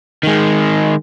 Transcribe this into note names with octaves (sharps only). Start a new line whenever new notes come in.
D#3 G#3